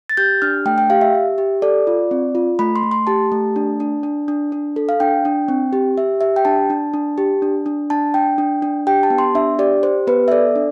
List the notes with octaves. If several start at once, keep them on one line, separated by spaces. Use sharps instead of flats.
A6
G4 G6
D4 F6
A3 G5
G5
G4 F5
E5
G4
G4
A4 D5
F4
C4
F4
A3 B5
C6
A3
C6
G4 A5
A3
D4
D4
D4
D4
D4
A4
F5
D4 G5
D4
C4
G4
G4 E5
G4 E5
G5
D4 A5
D4
D4
G4
D4
D4
D4 A5
D4 G5
D4
D4
G4 G5
A5
B3
C6
D4 E5
G4 D5
G4 C5
B3 B4
E5
A4 D5
D4